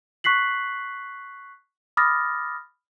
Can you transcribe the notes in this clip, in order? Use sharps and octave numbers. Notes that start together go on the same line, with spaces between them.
C#6 F#6 B6 C7 F#7
B5 D6 D#6 F6 A6 A#6